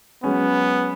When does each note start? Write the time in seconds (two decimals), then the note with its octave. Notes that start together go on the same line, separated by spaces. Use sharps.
0.24 F#3 G#3 B3 C#4